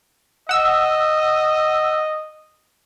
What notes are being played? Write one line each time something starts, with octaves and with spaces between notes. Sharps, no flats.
D#5 F#5 E6